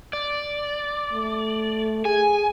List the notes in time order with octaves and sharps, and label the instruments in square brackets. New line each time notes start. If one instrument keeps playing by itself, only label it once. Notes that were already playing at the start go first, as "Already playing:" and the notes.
[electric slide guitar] D5
[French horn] A3
[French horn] G#4 [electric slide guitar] G#5